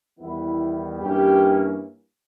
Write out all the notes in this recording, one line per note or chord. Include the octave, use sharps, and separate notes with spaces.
E2 D#3 G3 B3 E4
G2 E3 A#3 C#4 G4